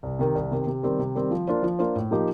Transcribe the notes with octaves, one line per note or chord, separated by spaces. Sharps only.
C2
C3 D#3
C2
C3 D#3
C3
D#3 G3 C4
C3
D#3 G3 C4
F3
A#3 D4 F4 C5
F3
A#3 D4 F4 C5
A2
F3 A#3 D#4 G4